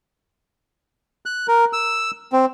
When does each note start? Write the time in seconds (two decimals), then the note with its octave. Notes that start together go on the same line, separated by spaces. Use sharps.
1.26 F#6
1.48 A#4
1.73 E6
2.33 C4